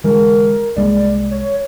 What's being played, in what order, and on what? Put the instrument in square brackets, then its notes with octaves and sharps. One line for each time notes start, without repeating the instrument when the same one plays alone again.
[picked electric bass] D3 E3 G#3 [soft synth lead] A#4
[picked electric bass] C2 G#3 A#3 [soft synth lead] D5
[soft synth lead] C#5